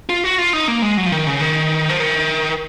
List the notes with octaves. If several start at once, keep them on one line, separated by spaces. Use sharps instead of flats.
F4
F#4
F4
D#4
A#3
G#3
F#3
F3
D#3
C#3
D#3
F3
D#3